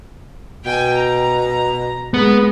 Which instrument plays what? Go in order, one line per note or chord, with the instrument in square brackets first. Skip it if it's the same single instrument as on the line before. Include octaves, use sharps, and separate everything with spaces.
[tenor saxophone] B2 [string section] G5 G#5
[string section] A#5
[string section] G#3 [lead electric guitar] B3